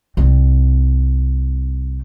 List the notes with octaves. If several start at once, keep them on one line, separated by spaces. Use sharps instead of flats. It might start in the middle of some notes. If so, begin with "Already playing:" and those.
C2 C4